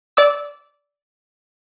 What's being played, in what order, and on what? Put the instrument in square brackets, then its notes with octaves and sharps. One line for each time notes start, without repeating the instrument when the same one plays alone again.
[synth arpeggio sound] D5 D6 E6